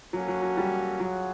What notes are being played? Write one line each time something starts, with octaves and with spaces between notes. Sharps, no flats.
F#3 A#3 C#4 F#4 A4
F#3
F#3
G3
F#3 F4 G#4 C#5 F#5